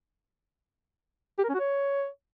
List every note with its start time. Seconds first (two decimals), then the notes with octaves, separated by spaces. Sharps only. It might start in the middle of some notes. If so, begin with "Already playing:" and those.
1.39 G4
1.44 A#4
1.49 C#4
1.55 F#4
1.60 C#5